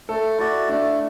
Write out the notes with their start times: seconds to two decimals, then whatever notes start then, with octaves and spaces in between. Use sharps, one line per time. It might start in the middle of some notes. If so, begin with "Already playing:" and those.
0.09 A3 A4
0.38 E4 F#4 D5
0.69 A3 D4